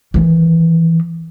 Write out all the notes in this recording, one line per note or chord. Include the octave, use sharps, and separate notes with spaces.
D#3 E3